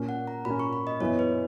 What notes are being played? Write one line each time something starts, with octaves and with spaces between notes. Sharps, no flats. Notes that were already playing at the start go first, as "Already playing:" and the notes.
Already playing: A#2 A#3 C#4
F#5
A#5
A#2 A#3 C#4 B5
C#6
B5
D#5
F#2 E3 B3 E4 C#5
B4